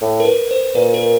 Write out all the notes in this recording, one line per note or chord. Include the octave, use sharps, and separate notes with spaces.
A2
A#4
B4
C5
A#2 B4
A#4